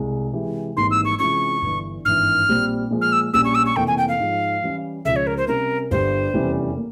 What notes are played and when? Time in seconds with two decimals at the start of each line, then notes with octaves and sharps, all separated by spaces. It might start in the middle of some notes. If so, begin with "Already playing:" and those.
Already playing: C2 G#3
0.33 C3 E3 G#3 E4 G4
0.76 G#1 G#2 E3 G3 A#3 C6
0.91 E6
1.05 C#6
1.19 C3 E3 G#3 C#4 F4 C#6
1.62 G1 G2 E3
2.05 G#1 G2 E3 F6
2.48 A#1 A#2 G3 C4
2.90 A#2 F3 G#3
3.01 F6
3.12 E6
3.34 A#1 A#2 G3 C#4 E6
3.45 C#6
3.55 E6
3.66 C#6
3.76 F1 F2 E3 A#3 G5
3.87 G#5
3.98 G5
4.08 F5
4.19 G#2 F3 G#3
4.63 E3 G3 C#4 E4
5.05 C#2 C#3 F3 E5
5.16 C#5
5.27 A#4
5.37 C5
5.48 C3 G3 C#4 A#4
5.91 G1 G2 G3 C5
6.34 F1 E2 E3 G3 C#4
6.77 A#3